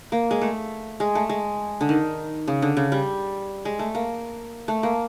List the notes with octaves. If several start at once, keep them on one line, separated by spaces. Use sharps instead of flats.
A#3
G#3
A3
G#3
A3
G#3
D3
D#3
C#3
D3
C#3
G3
G#3
A3
A#3
A3
A#3